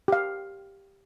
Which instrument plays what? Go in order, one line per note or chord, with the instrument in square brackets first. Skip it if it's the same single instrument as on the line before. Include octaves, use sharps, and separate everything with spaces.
[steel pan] G4 F5